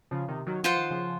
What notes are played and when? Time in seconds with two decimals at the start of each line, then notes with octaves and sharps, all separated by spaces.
0.11 C#3 F3
0.28 C3 D#3
0.47 D#3 F#3
0.64 F3 F4 C5 F#5
0.77 D#3
0.90 C#3 F3